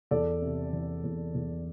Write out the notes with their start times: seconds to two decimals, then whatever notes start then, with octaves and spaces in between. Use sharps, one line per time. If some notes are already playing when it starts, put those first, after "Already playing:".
0.11 E2 A4 D5
0.42 C3
0.73 E3
1.04 E2
1.35 E2